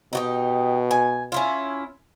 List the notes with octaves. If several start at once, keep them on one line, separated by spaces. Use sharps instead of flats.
B2 D#4 F#4 G4
G#5
C#4 E4 F4